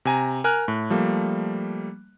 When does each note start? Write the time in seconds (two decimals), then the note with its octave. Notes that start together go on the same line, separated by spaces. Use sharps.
0.05 C3 G#5 A#5
0.44 A#4 G#5 F6 F#6
0.68 A2
0.90 F3 G3 A3 A#3